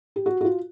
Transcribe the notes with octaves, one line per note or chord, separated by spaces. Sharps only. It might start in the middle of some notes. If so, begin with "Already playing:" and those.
G4
F#4
F#4
F4